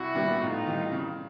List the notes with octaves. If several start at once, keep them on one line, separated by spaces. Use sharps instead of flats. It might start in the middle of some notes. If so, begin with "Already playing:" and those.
Already playing: C2 E4 F#4
A#2 G3 B3 D4
A2 D#4 F4
E3 G3
C#3